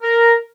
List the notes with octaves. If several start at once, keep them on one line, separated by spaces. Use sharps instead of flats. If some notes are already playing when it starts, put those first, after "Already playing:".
A#4